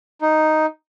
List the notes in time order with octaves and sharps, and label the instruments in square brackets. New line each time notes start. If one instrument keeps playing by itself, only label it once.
[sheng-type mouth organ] D#4